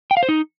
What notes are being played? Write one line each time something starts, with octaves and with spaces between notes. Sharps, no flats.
G5
F5
C5
D#4